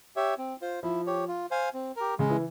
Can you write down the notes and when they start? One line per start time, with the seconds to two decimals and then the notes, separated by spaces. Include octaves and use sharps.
0.16 G4 C#5 E5
0.38 C4
0.62 F4 C5
0.83 F3 E4
1.07 G4 C#5
1.28 F4
1.51 C5 F5 G#5
1.74 C4
1.96 G4 A#4
2.19 C#3 G#3
2.30 E3